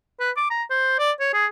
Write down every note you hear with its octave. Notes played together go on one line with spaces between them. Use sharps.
B4
D6
A#5
C5
D5
C#5
G#4